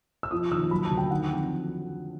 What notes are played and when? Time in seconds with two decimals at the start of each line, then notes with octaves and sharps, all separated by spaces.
0.23 E6
0.31 F3 D#6
0.51 D#2 E6
0.71 F#3 B5
0.85 A5
0.91 D2
0.98 G5
1.11 D#3 F#5
1.31 F2